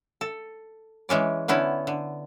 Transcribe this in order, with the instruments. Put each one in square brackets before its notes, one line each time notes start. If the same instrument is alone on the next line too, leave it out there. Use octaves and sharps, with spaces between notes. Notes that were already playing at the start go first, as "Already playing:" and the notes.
[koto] A4
E3 G#3 C#4 D5
D3 B3 C#4 E4
D3